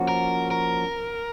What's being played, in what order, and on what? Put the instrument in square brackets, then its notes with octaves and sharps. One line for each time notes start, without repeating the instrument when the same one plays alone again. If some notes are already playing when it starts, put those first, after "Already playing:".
Already playing: [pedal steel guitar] F3 A#3 C#4 F#4 C5
[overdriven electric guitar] A#4
A#4